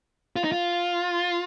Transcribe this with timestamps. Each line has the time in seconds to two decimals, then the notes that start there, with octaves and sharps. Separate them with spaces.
0.36 F4
0.44 D#4
0.52 F4